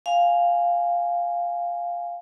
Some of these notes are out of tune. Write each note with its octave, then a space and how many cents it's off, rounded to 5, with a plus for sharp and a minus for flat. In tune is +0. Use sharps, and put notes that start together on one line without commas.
F5 +0 G#5 +0